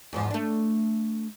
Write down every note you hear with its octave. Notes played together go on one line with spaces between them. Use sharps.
E2 G#2 F3
A3 D4